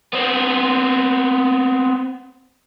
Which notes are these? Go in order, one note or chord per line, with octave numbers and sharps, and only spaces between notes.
B3 C4